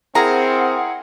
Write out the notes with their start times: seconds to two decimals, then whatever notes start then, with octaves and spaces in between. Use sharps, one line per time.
0.15 C4 E4 G#4 A#4 F#5 A#5